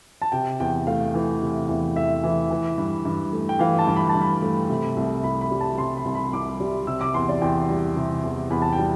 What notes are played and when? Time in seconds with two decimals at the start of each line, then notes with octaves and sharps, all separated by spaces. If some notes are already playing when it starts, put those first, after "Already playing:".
0.22 A5
0.32 C3 G5
0.60 E2 G5
0.87 A3 F5
1.14 E3
1.42 C3
1.69 E2
1.96 A3 E5
2.24 E3
2.51 E3
2.78 G2
3.05 G2
3.33 A3
3.49 G5
3.59 E3 F5
3.79 A5
3.87 G2
3.96 B5
4.09 A5
4.15 G2
4.21 B5
4.42 A3
4.69 C3
4.97 C2
5.24 C2 B5
5.41 B5
5.51 G3
5.61 A5
5.78 C3 C6
5.97 B5
6.05 C2
6.15 B5
6.33 C2 D6
6.60 G3
6.87 C3 E6
7.01 D6
7.14 E2 C6
7.29 D5
7.42 E2 G5
7.69 G3
7.96 C3
8.24 E2
8.50 E2 B5
8.62 A5
8.73 G5
8.78 G3